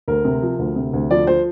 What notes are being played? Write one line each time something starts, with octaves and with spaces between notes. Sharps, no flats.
D2 A#4
C3
F3
D2
C3
D2
F3 D5
F3 C5